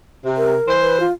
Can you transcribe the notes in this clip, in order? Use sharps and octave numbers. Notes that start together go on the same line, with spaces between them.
C3
A#4
E3 C5
B4
F4